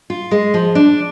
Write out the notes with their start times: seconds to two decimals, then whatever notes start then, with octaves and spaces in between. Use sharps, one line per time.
0.10 F4
0.31 G#3
0.54 F3
0.75 D4